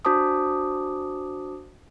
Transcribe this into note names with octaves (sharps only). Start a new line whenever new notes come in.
D4 F#4 C5 A5 D6 D#6